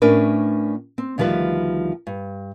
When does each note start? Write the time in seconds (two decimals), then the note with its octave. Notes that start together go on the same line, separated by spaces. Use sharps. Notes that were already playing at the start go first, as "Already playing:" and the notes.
0.02 A2 C#4 D4 A#4 B4
0.98 C4
1.18 D2 D#3 F3 G3 B4
2.07 G2